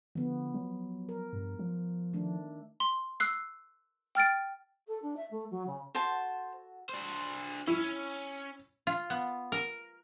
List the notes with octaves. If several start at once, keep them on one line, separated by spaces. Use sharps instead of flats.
D3 F3 B3
F#3
A#4
G2
F3
D#3 A3 D4
C6
E6 F#6 C7
G5 F6 A6 D7
A4
D4
E5
A3
F#3
C#3
F#4 A4 C5 E5 A5
D4 C5
C#4 E4
F4
B3
A#4